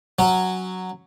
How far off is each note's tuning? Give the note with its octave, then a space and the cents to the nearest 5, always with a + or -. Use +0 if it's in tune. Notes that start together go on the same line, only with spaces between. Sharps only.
F#3 +0 C#4 +0